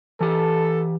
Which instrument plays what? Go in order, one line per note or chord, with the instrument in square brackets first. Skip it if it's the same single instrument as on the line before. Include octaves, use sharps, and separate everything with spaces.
[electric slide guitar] E3 G4 [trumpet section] A4